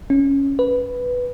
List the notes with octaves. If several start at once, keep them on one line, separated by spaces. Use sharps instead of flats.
C#4
B4